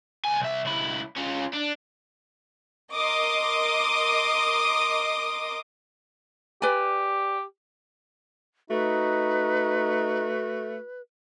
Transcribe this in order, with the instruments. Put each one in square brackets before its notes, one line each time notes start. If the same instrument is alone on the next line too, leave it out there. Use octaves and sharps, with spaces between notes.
[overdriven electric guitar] C#2 G#5
C2 E5
C#2 E4
C#4 F4
D4
[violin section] A#4 D#5 C6 D6 D#6
[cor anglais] G4 [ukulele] B4 D5 G#5
[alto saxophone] A3 [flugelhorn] D#4 [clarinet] F#4 [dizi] B4